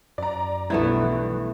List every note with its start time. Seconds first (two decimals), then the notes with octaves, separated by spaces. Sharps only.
0.18 F#2 D5 A#5
0.70 B1 G2 A3 B3 E4
1.04 E3